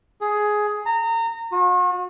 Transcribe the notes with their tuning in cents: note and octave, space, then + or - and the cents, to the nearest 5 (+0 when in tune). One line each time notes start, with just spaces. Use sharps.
G#4 +10
A#5 -25
F#4 -45